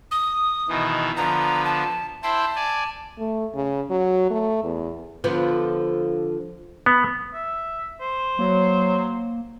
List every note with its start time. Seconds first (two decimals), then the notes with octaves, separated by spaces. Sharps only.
0.11 D#6
0.69 B2 D#3 E3
1.17 D3 F3 B3 A#5
1.65 A5
2.23 E4 C5 G5 A5
2.56 D5 G#5
3.18 A3
3.55 C#3
3.90 F#3
4.30 A3
4.63 E2
5.24 D3 F3 B3
6.86 B3
7.34 E5
8.01 C5
8.39 F#3 A#3